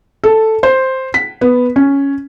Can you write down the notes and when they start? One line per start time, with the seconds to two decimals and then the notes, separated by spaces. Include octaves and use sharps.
0.24 A4
0.63 C5
1.14 B6
1.41 B3
1.76 C#4